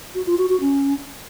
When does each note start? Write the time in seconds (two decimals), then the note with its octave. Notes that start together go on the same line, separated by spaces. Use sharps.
0.15 F#4
0.26 F4
0.38 F#4
0.49 F#4
0.61 C#4